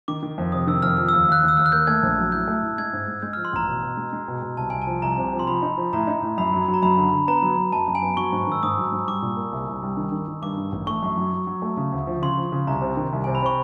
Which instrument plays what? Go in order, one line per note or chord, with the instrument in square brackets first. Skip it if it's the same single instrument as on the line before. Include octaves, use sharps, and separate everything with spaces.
[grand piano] D#3 [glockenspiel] D6
[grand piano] D#3
F2
[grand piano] C3 [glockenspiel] D#6
[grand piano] D#3 [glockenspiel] E6
[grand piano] F2 [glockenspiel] F6
[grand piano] F3 [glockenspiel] F6
[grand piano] D#2 [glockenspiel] E6
[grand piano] D#2 [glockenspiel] F#6
[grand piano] D#2
[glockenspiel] E6
[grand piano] D#2 [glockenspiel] F6
[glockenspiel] F#6
[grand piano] A#3 [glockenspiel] G6
[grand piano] A3 [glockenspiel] G#6
[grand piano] A#1
F#3
[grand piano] A2 [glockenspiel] G6
[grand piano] A3
A2
[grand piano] G#3 [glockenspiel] G#6
[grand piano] G#2
G#3
[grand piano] G#3 [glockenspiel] G6
[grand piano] F3 [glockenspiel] F6
[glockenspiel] C6
[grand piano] A1 [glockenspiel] A#5
[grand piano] B2
B2
G#3
G#3
B2
B2
[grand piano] C2 [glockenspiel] A5
[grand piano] C2 [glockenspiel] G#5
[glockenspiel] A5
[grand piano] F3
[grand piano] C2 [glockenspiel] A#5
[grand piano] C3
F3
[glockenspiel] C6
[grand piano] F3 [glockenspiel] B5
[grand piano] D#4
F3
[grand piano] A2 [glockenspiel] A#5
[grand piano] D#4
A2
[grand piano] F#2 [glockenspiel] B5
[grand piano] F#3
F#3
[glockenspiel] A#5
[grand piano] F#2 [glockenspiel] B5
[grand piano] D3
D3
[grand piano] B3 [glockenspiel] A#5
[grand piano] F#3
F#3
[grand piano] F#2 [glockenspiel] A5
[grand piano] F#2
[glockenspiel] G#5
[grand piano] B3
[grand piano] F#3 [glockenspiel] C#6
[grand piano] G#2
[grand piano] D#3 [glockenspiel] E6
[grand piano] G#2 [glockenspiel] D#6
[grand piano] F#3
G#2
[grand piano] G3 [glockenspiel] D6
[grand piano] A#2
A#3
C2
C2
G3
D#3
D#3
D#3
[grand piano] G2 [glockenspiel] D6
[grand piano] D#3
A1
[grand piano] A3 [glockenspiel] C#6
[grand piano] F#2
F#3
F#3
F#3
A3
C#3
D2
F3
[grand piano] C#3 [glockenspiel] C6
[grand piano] F3
C#3
[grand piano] C2 [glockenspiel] A#5
[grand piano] C3
D#3
C2
[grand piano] C3 [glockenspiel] G#5
[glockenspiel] B5
[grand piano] C3 [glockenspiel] C#6